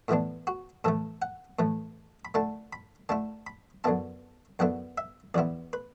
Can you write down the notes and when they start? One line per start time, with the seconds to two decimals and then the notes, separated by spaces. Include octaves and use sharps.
0.08 A2 E3 B3 D4 E4
0.47 F#4
0.84 A2 E3 A3 A4
1.22 F#5
1.59 A2 E3 A3
2.25 B5
2.34 D3 A3 E4 A5
2.73 B5
3.09 D3 A3 E4 A5
3.47 B5
3.84 F#2 D3 B3 E4 A5
4.59 F#2 D3 B3 E4 F#5
4.98 E5
5.34 E2 E3 B3 E4 D5
5.73 B4